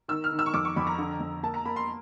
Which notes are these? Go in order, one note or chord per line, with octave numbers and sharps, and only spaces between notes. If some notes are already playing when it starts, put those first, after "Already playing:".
D#3 E6
F6
D#3
E6
C#6
F2 D6
C#6
F2 B5
A#5
D3
F2
A#3 A5
A#5
A#3 B5
C6